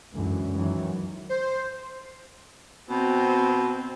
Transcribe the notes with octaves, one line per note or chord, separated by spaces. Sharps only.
C#2 F#2 D3 E3 G#3
F#2 D#3 E3 F#3
C5
B2 C4